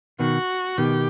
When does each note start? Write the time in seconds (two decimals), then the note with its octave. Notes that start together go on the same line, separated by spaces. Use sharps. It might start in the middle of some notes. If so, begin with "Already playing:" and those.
0.20 B2 D#3 F#4
0.78 B2 D#3 G4